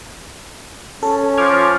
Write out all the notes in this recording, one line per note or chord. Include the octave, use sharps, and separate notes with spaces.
C#4 A4
F3 D6 F6 G#6